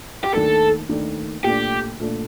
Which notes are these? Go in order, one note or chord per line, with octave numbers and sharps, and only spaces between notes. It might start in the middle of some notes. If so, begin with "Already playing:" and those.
G4
D#2 D#3 A3 D4 A4
D#2 D#3 A3 D4
A#2 A3 D4 G4
A#2 A3 D4